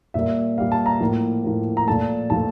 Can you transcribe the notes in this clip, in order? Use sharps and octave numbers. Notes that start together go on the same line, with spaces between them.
A#2 G3 A#3 E5
A#2 G3 A#3 F5
A5
A#5
A2 F3 A#3
A2 F3 A#3
A#5
A#2 F3 A3 A5
A#2 F3 A3 A5